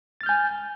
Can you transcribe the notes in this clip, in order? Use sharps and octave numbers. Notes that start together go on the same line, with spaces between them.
G#5 F6 G6 A6